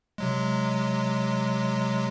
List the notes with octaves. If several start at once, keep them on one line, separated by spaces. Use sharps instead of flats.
C3 F#3 G#3